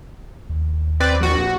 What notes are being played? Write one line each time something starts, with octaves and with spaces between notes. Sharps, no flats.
D#2
C4 B4 D5
A#1 F#4